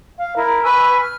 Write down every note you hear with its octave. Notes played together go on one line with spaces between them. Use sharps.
F5
E4 A#4
B4 G#5 C#6 E6
F6